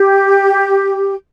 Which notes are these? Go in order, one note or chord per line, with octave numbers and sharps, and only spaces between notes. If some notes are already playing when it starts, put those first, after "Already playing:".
Already playing: G4